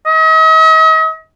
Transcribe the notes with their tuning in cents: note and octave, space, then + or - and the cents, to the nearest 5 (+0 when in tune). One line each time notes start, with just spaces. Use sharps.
D#5 +45